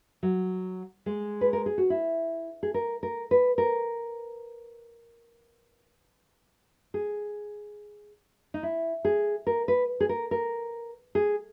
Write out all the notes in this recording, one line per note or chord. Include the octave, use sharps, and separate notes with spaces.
F#3
G#3
B4
A#4
G#4
F#4
E4
G#4
A#4
A#4
B4
A#4
G#4
D#4
E4
G#4
A#4
B4
G#4
A#4
A#4
G#4